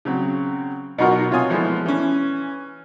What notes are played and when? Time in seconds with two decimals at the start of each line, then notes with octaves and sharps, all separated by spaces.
0.05 C#3 F#3 C4
0.98 B2 F#3 D#4 F4 F#4 A#4
1.31 C3 F4 C#5 F5 G#5 D#6
1.50 E3 F3 G#3 A3 B3 F4
1.86 E3 C#4